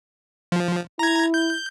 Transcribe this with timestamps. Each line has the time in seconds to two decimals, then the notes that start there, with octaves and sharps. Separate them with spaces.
0.52 F3
0.99 E4 A#5 G#6
1.34 G6